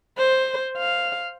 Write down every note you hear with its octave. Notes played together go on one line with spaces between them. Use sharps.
C5
F5